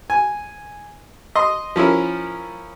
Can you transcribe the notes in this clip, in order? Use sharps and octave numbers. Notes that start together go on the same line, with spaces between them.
G#5
D#5 C6
F3 C#4 E4 A#4